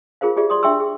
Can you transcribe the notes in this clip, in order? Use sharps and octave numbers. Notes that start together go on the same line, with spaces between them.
F4 G#4 A#4 C5 F5
F4 G4 G#4 D5 E5
D5 C6 D#6
D4 E5 G5 C6 C#6 E6
G#4